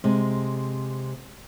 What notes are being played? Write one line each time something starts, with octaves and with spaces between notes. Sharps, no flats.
C3 G#3